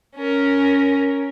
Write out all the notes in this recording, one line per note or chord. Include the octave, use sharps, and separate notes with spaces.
C#4 A#4